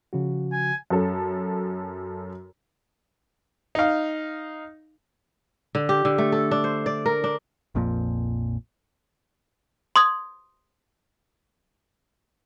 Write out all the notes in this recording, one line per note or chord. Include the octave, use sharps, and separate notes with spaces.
C#3 F3 F#4
G#5
F#2 C#4 A4
D#4 F5
D3
G4
D3
A3
A4
D4
C5
D5
A#4
D4
A#1 F2 A#2 F3
C6 D#6 G#6